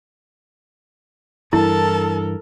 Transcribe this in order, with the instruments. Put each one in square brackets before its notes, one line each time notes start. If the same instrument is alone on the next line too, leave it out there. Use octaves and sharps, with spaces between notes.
[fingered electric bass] G2 E3 [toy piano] E4 [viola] A4 A#4 [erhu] A5